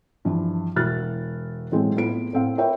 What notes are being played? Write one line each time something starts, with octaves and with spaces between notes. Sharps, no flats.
G2 E3 F3
E1 E4 F#4 F6 F#6 A6
A2 E3 F#3 G#3 C4
A2 B3 F4 G#4 B4 D7
A2 C4 F5
F4 A#4 B4 C#5 E5 G5